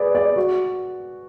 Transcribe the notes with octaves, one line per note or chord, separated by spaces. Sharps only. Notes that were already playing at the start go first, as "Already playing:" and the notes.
Already playing: G#4 B4 D5
D5
F#4